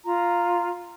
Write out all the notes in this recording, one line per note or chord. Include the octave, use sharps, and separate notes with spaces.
F4 A#5